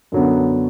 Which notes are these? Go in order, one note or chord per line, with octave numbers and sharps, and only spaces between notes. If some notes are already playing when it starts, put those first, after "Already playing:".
F#2 D3 F#3 B3